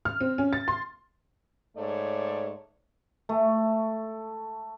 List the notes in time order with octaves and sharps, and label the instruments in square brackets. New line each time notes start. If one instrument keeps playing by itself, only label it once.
[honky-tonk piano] F6
C4
C#4
A6
C6
[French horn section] G#2 A3 C#5 D5
[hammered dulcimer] A3